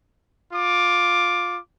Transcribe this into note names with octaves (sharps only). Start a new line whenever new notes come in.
F4 D6